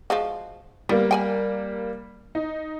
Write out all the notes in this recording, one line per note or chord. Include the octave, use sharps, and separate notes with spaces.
F3 G#3 F#4
G3 A#3 B3 A#4
G5 G#5 B5
D#4